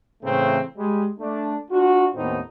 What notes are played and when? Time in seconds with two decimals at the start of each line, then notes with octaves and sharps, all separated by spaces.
0.22 A2 C#3 E3 A3 C4
0.77 G3 G#3
1.20 A3 D4
1.71 D4 F4 F#4
2.14 D#2 A2 B3 C4 D#4